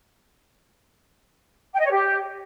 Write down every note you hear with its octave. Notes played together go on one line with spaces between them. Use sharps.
G5
D#5
C#5
G4